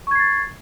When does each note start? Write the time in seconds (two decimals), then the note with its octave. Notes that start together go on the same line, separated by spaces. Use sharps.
0.07 C#6
0.11 G#6
0.15 C7
0.19 A6